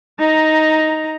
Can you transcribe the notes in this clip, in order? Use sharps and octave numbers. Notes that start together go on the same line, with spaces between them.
D#4 A#5